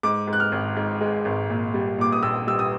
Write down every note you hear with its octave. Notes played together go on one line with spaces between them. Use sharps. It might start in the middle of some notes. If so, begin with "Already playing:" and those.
G#2 D6
G#2
F#6
F6
G#1
G#2
G#3
G#1
A#2
G3
A#2 D6
D#6
A#1 E6
G3 E6
D#6